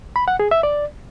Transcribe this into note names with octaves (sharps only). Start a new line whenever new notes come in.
B5
F#5
G#4
E5
D5